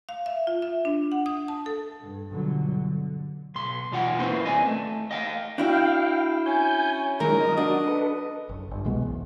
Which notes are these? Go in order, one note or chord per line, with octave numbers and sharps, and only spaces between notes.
F5
E5
F4
E5
D4
F#5
D#6
A5
A4
G2
G1 B2 D3 F#3
D3
B1 C6
E2 B2 F4 F#5 G5
A#3 C4 C#4 E4 B4 C5
D#2 D5 D#5 G#5
A3
D#5 F5 G5
D4 E4 F#4 F5 G5
C#4 G#5 G6
F#2 A#2 D#3 G#3 A#4
D#5
D4 F#4 D#5
A4 B4
F#1
G1
C2 B2 G#3 B3
B1 E2